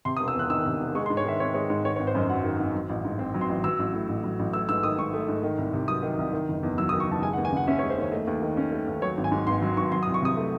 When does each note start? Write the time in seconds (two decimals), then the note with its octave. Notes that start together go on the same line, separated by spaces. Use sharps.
0.05 C3 C6
0.17 D#6
0.20 E1
0.28 E6
0.35 E2 F#6
0.50 D#3 E6
0.65 C3
0.80 E1
0.95 G#3 C#6
1.06 C6
1.10 G#2
1.17 C#5
1.25 D#3 E5
1.40 C4 C#5
1.54 G#3 C#5
1.69 G#2 C#5
1.85 D#3 C#5
1.96 C#5
1.99 G#1
2.07 C5
2.15 F#2 D#5
2.29 F#3 F#5
2.44 D#3
2.59 G#1
2.74 F#3
2.89 A1
3.05 G#2
3.19 C4
3.34 F#3
3.41 C6
3.49 A1
3.64 F#3 E6
3.79 A1
3.94 A2
4.09 A1
4.24 F#3
4.39 A1
4.53 A3 E6
4.69 G#2 E6
4.83 D#3 D#6
4.98 G#2 C#6
5.13 A3
5.28 G#2
5.43 D#3
5.58 C2
5.73 C3
5.88 F#3 D#6
6.03 D#3
6.18 C2
6.33 D#3
6.48 F#1
6.63 E2
6.78 F#3 E6
6.89 D#6
6.93 D#3
7.00 C#6
7.08 F#1 A5
7.22 G#3 G#5
7.33 F#5
7.38 D#2
7.45 G#5
7.52 C#3 F#5
7.67 C#4 E5
7.79 C#5
7.83 G#3
7.90 C5
7.98 D#2 C#5
8.12 A3 D#5
8.27 D#2
8.42 D#3
8.57 C#4
8.72 A3
8.87 D#2
9.02 F#3 C#5
9.17 G#1
9.24 G#5
9.32 G#2
9.47 G#1 C6
9.62 F#3
9.77 G#1 C#6
9.92 F#3 C6
10.03 D#6
10.07 C2
10.14 C#6
10.22 C3 D#6
10.37 A3